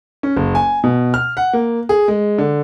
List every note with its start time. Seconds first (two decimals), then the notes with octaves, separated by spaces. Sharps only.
0.23 C#4
0.36 F#1
0.55 G#5
0.84 B2
1.14 F6
1.37 F#5
1.53 A#3
1.89 G#4
2.08 G#3
2.38 D3